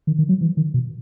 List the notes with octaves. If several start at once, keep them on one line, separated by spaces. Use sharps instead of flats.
D#3
D#3
F#3
E3
D#3
B2